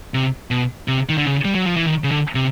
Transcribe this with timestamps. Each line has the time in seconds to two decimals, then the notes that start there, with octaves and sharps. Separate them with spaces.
0.14 C3
0.51 B2
0.88 C3
1.09 D#3
1.18 D3
1.25 C#3
1.45 G3
1.55 F#3
1.66 F3
1.76 E3
1.86 D#3
2.04 C#3
2.11 D3
2.35 C3